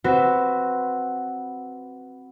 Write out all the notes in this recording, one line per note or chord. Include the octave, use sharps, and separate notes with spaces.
C4 F#4 B4